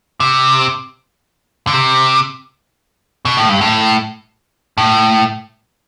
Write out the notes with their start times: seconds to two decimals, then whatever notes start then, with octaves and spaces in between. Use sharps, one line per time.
0.20 C3
1.67 D3
1.73 C3
3.25 B2
3.37 A2
3.49 G2
3.61 A2
4.78 A2